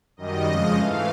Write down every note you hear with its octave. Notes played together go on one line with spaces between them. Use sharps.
F#2 D#3 G3 D#5
F2 C#3 F3 G#3
G#2 E3 A3 F5